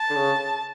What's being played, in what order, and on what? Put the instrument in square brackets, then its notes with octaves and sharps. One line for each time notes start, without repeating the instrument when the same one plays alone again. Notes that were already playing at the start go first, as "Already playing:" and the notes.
Already playing: [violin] A5
[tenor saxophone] D3
C#3